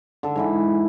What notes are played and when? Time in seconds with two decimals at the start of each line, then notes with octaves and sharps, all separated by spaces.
0.23 D3 A4
0.36 G#2 E3 B5